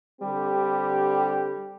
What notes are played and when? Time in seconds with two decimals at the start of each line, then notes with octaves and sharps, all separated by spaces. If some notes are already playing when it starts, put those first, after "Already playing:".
0.21 D3 G3 C4 G4